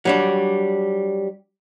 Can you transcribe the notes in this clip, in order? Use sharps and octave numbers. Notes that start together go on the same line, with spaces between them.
F#3 G3 D4